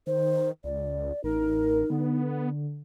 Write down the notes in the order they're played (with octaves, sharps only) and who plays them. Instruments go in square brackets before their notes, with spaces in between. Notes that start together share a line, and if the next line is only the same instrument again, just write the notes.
[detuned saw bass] D#3 [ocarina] C5
[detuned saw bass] C#2 [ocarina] D5
[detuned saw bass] A1 [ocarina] D#4 [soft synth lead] A#4
[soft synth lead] D3 [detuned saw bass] B3